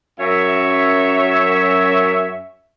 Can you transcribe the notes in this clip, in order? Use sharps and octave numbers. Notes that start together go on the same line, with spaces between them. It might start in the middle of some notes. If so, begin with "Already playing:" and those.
F#2 C#5 E5